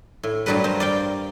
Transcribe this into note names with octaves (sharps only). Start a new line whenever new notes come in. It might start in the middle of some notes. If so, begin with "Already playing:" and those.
A2
G2 F#3 G3 A#4 B4
A#4 C5 F5
D5 F5 G5